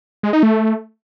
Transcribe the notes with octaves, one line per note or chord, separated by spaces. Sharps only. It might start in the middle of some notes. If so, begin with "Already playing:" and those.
G#3
D#4
A3